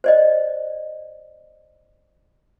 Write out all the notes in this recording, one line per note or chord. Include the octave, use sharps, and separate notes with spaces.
C5 D5 D#5